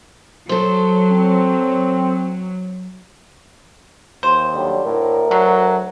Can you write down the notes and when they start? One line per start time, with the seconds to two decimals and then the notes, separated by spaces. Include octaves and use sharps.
0.49 F#3 A4 C5
1.11 C4
4.23 D#2 C5
4.55 D3 F#3 G3
4.85 D2 A2 A#4
5.31 D3 F#3